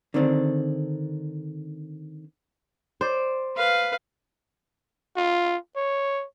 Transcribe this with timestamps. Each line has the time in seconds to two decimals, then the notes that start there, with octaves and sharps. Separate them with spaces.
0.14 D3 D#3 C4 D4
3.01 C5 D5
3.57 B4 F5
5.17 F4
5.76 C#5